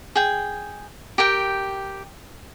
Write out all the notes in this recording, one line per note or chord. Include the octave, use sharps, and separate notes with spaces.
G#4 G5
G4 A#4 G5